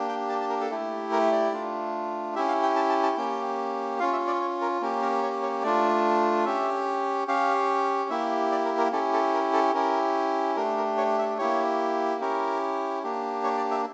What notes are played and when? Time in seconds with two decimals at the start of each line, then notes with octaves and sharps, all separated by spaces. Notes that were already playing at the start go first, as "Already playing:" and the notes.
Already playing: A#3 D4 G4
0.09 G5
0.29 A5
0.40 A5
0.49 A#4
0.61 A4
0.70 A3 E4 G4
1.12 A#4
1.32 D5
1.52 A3 D4 F4
2.36 C#4 E4 G4 E5
2.48 F5
2.63 G5
2.76 A5
2.89 A5
3.03 A5
3.17 A#3 C#4 G4 G5
4.00 C#4 F4 F5
4.13 E5
4.27 D5
4.40 C#5
4.61 A#4
4.81 A#3 C#4 G4 A#4
5.02 A#4
5.23 C#5
5.42 C#5
5.63 A3 D4 F4 D5
6.45 C#4 G4 E5
7.28 C#4 G4 F5
8.10 A#3 E4 G4 E5
8.52 D5
8.65 A#4
8.78 A#4
8.92 C#4 E4 G4 A4
9.13 A4
9.34 A#4
9.54 A4
9.74 C#4 E4 G4 A#4
10.56 A3 D4 G4 A#4
10.77 A#4
10.97 C#5
11.19 E5
11.38 A#3 E4 G4 C#5
12.21 C#4 E4 G4 A#4
13.03 A#3 D4 G4
13.44 C#5
13.57 D5
13.71 E5